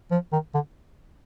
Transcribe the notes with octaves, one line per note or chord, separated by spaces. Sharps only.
F3
D#3
D3